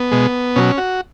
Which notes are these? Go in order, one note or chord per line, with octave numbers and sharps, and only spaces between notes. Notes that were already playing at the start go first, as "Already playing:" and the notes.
Already playing: B3
B2 G#3
B2 F#3 C#4
F#4